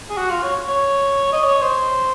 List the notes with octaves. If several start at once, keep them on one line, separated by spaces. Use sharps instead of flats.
G#4
F#4
F4
C#5
C#5
D#5
C#5
C5